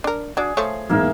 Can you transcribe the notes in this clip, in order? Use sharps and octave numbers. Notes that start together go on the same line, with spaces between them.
D4 A#4
D4 F#4 G#4 D5
F3 A3 C#5
E2 G#2 A#3 B3 E5 F5